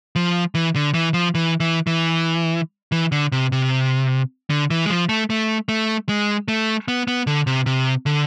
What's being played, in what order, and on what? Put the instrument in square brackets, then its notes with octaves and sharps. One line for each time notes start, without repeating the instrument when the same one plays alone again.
[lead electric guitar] F3
E3
D3
E3
F3
E3
E3
E3
E3
D3
C3
C3
D3
E3
G#3
F3
A3
A3
A3
G#3
A3
B3
B3
D3
C3
C3
D3